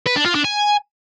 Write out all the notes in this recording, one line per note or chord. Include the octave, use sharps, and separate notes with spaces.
B4
D4
F4
D4
G#5